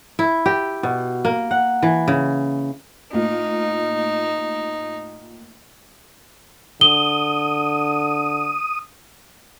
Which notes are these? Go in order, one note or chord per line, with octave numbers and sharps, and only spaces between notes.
E4
G4
B2
A#3
F#5
E3
C#3
A2 A#3 D#4 F4
D3 D#6 G7